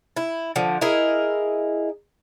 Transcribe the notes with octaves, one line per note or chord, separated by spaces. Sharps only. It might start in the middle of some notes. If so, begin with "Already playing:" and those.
E4
D3 F3
E4 G#4 A#4 D#5